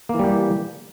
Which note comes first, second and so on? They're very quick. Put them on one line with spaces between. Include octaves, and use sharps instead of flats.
A#3 E3 G3 G4